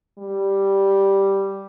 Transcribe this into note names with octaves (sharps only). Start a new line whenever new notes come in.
G3